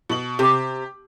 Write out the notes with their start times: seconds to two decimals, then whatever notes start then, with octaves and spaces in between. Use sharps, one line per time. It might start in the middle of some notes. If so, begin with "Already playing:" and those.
0.10 B2 F#7
0.39 C3 G4